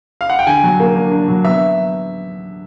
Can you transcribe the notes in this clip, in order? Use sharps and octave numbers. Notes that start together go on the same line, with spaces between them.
F5
F#5
G5
D3 G#5
F#3
A#3
D4
D4
F#3
B3 E5